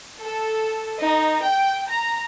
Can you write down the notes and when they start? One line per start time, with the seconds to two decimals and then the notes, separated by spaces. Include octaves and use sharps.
0.19 A4
1.01 D#4
1.42 G5
1.88 A#5